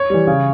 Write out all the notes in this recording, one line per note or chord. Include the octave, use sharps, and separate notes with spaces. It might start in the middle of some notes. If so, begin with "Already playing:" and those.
Already playing: C#5
E3 G3
C#3